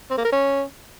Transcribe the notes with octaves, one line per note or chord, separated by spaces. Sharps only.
C4
A#3
A#4
C#4